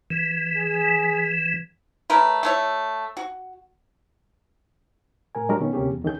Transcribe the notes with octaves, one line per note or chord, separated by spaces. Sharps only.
E3
G#4
A3 C#4 A#4 B4
A3 E4 C#5
F#4
A2 A#4 G#5
F#3 G#3 D4 F#4 G4 A#4
B2 D#3 B3 C#4
D2 C3 A#3 C#4 G4 G#4
E2
C#2 D#3 E3 C#4 G#4 G6